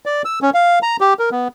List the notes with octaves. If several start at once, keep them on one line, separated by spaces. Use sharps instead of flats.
D5
E6
C#4
F5
A#5
G4
A#4
B3